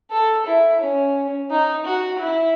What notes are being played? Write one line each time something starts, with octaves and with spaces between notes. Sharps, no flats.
A4
E4
C#4
D#4
F#4
E4